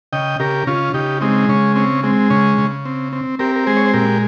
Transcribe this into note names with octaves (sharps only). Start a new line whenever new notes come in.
C#3 D#5 G5
C#3 G4 A#4
C#3 C#4 F4
C#3 D#4 G4
G#3 C4 D#4
C#3 C#4
C4 C#4
G#3 C4
C#3 C#4
C#3
C4
C4
C4 G4 A#4
A#4
G#3 G#4 C5
C#5
C5
A#2 G4 A#4